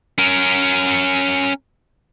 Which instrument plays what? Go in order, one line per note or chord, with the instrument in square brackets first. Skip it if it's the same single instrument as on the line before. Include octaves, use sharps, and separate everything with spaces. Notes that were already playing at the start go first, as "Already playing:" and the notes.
[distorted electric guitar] C#4 A#4